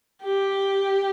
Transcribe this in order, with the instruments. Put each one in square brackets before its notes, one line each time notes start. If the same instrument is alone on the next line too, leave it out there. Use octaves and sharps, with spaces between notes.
[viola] G4